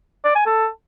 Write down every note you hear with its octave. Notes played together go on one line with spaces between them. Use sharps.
D5
G#5
A4